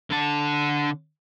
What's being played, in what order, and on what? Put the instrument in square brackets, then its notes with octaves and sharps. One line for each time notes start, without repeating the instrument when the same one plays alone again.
[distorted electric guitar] D3 A5